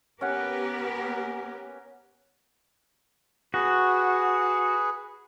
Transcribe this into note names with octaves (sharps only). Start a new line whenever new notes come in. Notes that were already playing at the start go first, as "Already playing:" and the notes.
B3 C#4 G4 A#4 F#5
F#4 G#4 B4